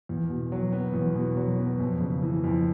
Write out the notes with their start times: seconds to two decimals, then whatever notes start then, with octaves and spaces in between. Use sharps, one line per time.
0.09 E2
0.30 B2
0.52 F#3
0.72 B3
0.94 E2
1.15 B2
1.37 F#3
1.58 B3
1.80 F2
2.00 C#3
2.22 E3
2.44 F2